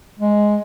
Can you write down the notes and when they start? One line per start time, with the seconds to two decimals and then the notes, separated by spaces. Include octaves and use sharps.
0.19 G#3